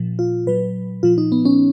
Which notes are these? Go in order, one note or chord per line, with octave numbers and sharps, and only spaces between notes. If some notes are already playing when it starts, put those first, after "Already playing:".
Already playing: A#2 F3
F4
A#2 F#3 B4
A#2 F3 F4
D#4
B3
C#4